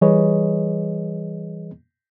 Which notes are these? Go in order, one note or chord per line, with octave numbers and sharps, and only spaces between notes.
E3 G3 G#4 B4 C#5 D#5